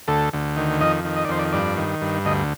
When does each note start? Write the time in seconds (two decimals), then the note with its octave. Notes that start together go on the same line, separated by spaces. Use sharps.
0.08 D2 A4
0.33 D2
0.57 D#3
0.81 F2 D#5
1.04 D#3
1.16 D#5
1.25 D5
1.29 F2 C5
1.39 D5
1.53 G2 D5
1.77 D#3
2.02 G2
2.25 D2 D#5